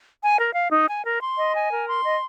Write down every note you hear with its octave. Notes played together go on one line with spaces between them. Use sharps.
G#5
A#4
F5
D#4
G#5
A#4
C6
D#5
G#5
A#4
C6
D#5